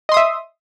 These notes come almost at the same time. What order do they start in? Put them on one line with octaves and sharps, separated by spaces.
D#5 C6 D#6 E5